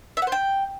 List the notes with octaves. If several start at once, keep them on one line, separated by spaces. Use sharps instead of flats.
E5
F#5
C5
G5